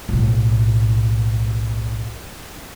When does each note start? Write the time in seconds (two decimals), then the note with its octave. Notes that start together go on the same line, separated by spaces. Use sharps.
0.09 B1 A2